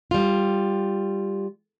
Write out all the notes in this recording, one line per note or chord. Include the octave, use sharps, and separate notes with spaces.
G3 F4